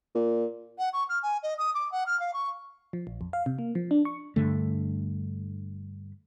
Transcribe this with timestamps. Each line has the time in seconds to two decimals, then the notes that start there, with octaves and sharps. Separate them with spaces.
0.15 A#2
0.78 F#5
0.93 C#6
1.09 F6
1.22 G#5
1.42 D#5
1.57 D#6
1.74 D6
1.91 F#5
2.06 F6
2.19 F5
2.33 C#6
2.93 F3
3.07 A#1
3.21 F2
3.33 F5
3.46 C3
3.59 A#3
3.75 F3
3.91 D4
4.05 C#6
4.36 G2 D3 A3